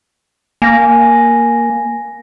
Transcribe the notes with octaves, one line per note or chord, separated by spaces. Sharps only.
A#3 G#5 A#6